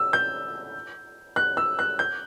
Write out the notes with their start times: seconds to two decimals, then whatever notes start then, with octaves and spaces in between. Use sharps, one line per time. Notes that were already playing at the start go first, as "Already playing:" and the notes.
Already playing: E6
0.13 G6
1.36 F#6
1.57 E6
1.79 F#6
1.99 G6